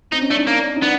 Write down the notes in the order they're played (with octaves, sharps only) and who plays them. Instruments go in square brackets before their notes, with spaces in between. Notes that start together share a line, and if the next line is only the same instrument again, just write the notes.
[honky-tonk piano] C4 [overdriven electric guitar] D#4
[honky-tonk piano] C#4
[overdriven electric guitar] A3 [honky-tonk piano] D4
[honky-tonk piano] D#4
[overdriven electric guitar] A#3
[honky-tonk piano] D#4
[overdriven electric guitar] B3 [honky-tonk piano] D4